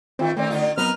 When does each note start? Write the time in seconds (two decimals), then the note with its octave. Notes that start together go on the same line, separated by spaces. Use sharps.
0.19 D#3 A3 C4 F4
0.37 D#3 A3 C4 C#4 D5
0.50 D3 D#4 F4
0.78 F#3 B3 C4 D#4 A#4 B4 F6